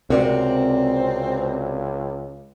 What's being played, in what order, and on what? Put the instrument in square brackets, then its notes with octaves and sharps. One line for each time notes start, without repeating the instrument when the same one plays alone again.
[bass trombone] C#2 [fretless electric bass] C3 [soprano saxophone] C4 [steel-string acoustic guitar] F#4 A#4 D5